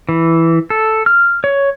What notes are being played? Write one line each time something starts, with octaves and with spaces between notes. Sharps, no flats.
E3
A4
F6
C#5